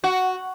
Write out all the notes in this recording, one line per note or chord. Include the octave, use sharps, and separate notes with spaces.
F#4